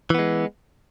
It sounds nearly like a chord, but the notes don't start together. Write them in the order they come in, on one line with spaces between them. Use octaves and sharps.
E3 B3 G#3